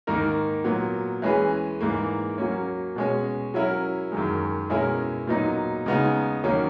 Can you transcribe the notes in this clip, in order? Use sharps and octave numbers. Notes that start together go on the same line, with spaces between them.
G#2 D#3 A#3 D#4 A#4
A#2 F#3 B3
E3 G#3 C#4 G#4 B4
G#2 E3 A#3
F#3 A#3 C#4
B2 G#3 C#4
F#3 C#4 E4 A#4
F#2 D#3 G#3
B2 G#3 C#4 E4 A#4
A#2 F#3 B3 D#4
C#3 G#3 B3 D#4
D#3 F#3 A#3 C#4